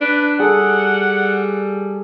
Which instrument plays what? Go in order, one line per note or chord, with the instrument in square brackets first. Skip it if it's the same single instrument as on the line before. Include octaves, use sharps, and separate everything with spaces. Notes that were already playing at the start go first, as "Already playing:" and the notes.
[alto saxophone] D4 [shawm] B4
[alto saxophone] G3 [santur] G#4 A4 [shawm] F#5